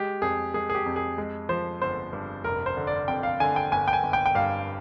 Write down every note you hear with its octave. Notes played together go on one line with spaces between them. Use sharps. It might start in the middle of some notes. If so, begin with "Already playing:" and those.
Already playing: G#3 G4
F2 G#4
G#3 G#4
G#4
G4
F2
G#4
G#3
F3 C5
G1 C5
G2
F1 A#4
C5
D3
D5
F2 G5
F5
D3 G#5
G5
G1 G#5
G5
G#5
G1
G5
G5
G2 F5